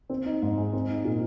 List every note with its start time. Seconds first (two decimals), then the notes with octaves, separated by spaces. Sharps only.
0.10 C4
0.26 D#4
0.42 G#2
0.58 G#3
0.73 C4
0.89 D#4
1.05 A#2